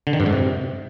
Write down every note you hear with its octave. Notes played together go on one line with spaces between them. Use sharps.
D3
D#3
G2
G#2
C3